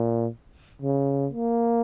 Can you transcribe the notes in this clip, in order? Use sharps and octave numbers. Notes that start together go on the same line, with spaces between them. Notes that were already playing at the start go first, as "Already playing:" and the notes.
Already playing: A#2
C#3
A#3